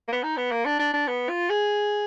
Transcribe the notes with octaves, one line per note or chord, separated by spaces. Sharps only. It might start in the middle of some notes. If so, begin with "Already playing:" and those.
A#3
B3
D#4
B3
A#3
D4
D4
D4
B3
F4
G#4